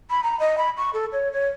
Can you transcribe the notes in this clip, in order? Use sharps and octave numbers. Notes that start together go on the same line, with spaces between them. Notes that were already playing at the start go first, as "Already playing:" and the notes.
B5
A#5
D#5
B5
C#6
A4
C#5
C#5